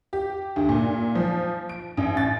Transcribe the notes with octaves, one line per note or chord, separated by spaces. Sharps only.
G4
D2
A#2
F3
D7
A1
A6